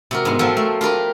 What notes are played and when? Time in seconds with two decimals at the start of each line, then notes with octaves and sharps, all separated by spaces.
0.11 C3 F#4 A#4
0.25 G#2 B3
0.39 F3 F#3 C4 F4 A4 C5
0.57 A3
0.81 F4 G4 A#4 B4